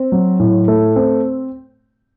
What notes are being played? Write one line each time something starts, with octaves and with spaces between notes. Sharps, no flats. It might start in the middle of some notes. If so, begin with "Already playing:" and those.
Already playing: C4
F#3
A2
A3
C4